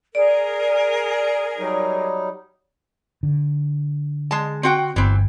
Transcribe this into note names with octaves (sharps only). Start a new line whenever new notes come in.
G#4 A#4 D5
F#3 G3 D#4
D3
G#3 A5
C4 F#4 G5
G1 E3 C4